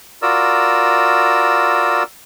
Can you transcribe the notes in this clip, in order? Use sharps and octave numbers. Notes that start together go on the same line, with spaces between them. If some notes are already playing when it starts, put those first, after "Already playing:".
F4 F#4 A#4 D5 E6